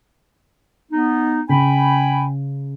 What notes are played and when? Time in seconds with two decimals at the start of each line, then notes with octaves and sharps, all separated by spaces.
0.91 B3 D#4
1.49 C#3 G5 G#5 B5